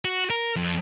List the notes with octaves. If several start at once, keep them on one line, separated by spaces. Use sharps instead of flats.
F#4
A#4
F2